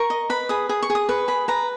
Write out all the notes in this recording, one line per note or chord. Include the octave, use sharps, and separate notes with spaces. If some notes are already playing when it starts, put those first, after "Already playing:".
Already playing: A#4 C#6
D#5
B4 B5
G#4 D#6
G#4 D#6
C#6
G#4
D#6
B4 C#6
G#4 B5
B4 A#5